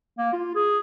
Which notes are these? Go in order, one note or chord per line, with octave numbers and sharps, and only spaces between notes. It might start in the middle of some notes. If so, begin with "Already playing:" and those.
A#3
F4
G#4